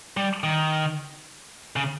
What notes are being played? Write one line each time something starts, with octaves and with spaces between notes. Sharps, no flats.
G3
D#3
C#3